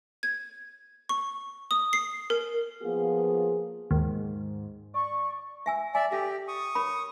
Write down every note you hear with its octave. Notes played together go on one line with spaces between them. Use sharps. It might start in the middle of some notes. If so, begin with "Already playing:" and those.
G#6
C#6
D#6
C7
A#4
F3 A#3 B3 F4 G#4
D#2 G#2
D5 C#6
E5 G#5 E6
D5 E5 G#5
G4 A4 E5
C#6 D#6
A#4 C#5 B5